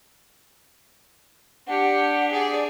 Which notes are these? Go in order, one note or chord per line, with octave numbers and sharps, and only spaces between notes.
D4 G4 F#5
G#4 D5